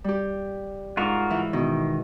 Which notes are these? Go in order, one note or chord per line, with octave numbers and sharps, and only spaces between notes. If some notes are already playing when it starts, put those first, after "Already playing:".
G3 G4
G#2 D#4 F4 F#4 A#4
E3 E4
B2 D#3